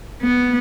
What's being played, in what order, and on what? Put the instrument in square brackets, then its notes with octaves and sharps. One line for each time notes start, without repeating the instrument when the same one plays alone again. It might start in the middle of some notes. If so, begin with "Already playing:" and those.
[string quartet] B3